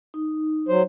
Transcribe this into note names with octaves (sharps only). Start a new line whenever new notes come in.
D#4
F#3 C5